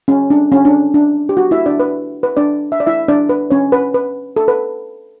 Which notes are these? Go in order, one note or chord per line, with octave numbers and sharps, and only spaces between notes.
C#4
D4
C#4
D4
D4
G4
F#4
E4 E5
D4 D5
B4
B4
D4 D5
E5
D5
E4 E5
D4 D5
B4
C#4 C#5
B4
B4
A4
B4